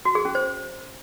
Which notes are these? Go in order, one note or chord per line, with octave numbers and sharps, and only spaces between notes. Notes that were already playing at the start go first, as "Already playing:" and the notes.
F#4
G#4
C#4
C5